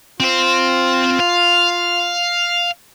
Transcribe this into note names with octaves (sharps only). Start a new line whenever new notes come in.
C4 F4 C5
F5